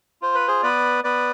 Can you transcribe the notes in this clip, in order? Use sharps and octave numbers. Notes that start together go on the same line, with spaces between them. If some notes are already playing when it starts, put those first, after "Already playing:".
F4 C5
B4
G#4 C5
B3 B4 D5
B3 B4 D5